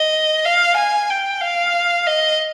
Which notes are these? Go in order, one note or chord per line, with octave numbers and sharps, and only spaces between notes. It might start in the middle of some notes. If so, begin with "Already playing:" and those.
Already playing: D#5
F5
G#5
G5
F5
D#5